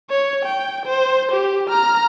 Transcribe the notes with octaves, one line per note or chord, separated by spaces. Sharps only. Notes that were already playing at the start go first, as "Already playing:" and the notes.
C#5
G5
C5
G4
A#5 F6